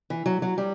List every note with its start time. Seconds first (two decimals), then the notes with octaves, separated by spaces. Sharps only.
0.10 E3
0.26 F#3
0.42 F#3
0.58 G3